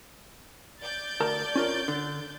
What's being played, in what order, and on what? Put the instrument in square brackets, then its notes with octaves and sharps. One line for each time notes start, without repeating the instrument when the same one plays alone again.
[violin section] D5 G6 A6
[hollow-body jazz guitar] D2 A#4 A5
C#4 F4 A#4
D3